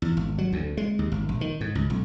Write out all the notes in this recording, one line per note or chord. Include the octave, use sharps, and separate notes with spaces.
E2
G#1
F#3
D2
G#3
D#2
G#1
A#1
D#3
G#2
C#2
B1